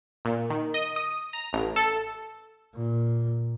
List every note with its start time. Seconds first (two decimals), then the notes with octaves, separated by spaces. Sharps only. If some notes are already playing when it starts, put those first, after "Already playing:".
0.25 A#2
0.50 D#3
0.74 D#5
0.96 D#6
1.33 A#5
1.53 A1
1.76 A4
2.75 A#2